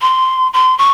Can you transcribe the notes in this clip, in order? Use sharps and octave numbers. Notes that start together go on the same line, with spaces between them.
C6
C6
C#6